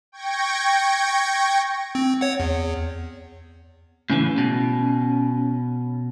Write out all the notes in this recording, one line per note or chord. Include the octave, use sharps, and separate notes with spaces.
G5 C#6 G#6 A#6
C4
C#5 F#5
E2
A2 C#3 E3 C#4
B2